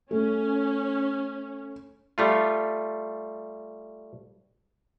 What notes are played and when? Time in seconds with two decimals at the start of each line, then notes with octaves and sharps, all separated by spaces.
0.11 A3 C#4
2.18 G3 A3 F4